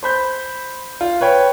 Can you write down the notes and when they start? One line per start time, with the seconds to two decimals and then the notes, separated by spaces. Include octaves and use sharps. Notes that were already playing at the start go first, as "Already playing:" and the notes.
0.03 C5 B5 G6
1.01 F4
1.21 B4 C#5 G5